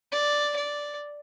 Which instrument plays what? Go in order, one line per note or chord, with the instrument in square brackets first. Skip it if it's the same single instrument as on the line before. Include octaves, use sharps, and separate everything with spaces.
[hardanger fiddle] D5
D5